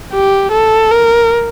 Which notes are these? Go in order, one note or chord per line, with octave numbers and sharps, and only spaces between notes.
G4
A4
A#4